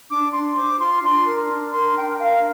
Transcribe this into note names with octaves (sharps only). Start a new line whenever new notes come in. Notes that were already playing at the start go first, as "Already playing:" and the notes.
D4 D6
D4 C6
C5 D6
F4 C6
D4 C6
A#4
D4
A#4 C6
D4 G5
A#4 F5